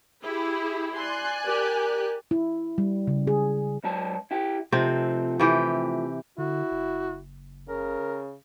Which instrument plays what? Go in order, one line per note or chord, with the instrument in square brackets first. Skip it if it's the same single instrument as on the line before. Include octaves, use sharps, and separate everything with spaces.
[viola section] E4 G4 G#4
[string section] D5 G#5 F#6 [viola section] C6
[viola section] G4 [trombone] A#4
[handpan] E4
G3
C#3
G#4
[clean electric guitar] G#2 F#3 A5
E4 G4
[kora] C3 C4 [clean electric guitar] F3 A3
[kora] C3 E3 G4
[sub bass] D3 [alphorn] E4 [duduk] F#4
[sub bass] F#1
[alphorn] C#3 [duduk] A#4